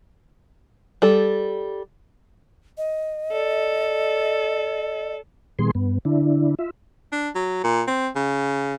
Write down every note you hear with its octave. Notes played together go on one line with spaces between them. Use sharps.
G3 A4
D#5
A4 D5
A#2 D#3 G3 B3 G#4 C6
G2 B3
D3 D4 E4
F4 E5
D4
F#3
A#2
C4
C#3